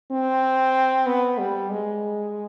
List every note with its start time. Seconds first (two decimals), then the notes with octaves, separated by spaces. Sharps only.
0.11 C4
1.07 B3
1.38 G3
1.71 G#3